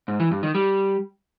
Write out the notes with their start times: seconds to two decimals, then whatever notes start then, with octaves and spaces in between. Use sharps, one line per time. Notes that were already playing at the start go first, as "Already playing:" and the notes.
0.08 G#2
0.20 E3
0.31 G2
0.43 D#3
0.55 G3